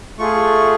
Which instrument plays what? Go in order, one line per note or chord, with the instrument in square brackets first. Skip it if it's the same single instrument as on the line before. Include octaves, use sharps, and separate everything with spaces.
[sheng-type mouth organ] A3 F4 G#4 C#6